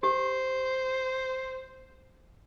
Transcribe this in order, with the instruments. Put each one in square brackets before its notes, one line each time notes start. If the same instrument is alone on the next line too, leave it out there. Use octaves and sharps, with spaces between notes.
[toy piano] G4 [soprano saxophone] C5